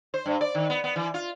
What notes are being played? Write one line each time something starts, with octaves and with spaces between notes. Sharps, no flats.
C5
G2
D5
D#3
B3
B3
E3
F4